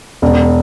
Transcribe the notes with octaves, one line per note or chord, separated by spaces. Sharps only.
E1